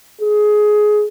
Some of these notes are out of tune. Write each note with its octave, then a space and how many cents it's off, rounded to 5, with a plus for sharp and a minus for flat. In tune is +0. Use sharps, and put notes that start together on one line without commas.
G#4 +15